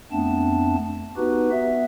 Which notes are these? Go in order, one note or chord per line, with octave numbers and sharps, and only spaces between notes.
F2 A3 B3 C4 D4 A5
B3 D#4 F#4 G4 B4
B3 E5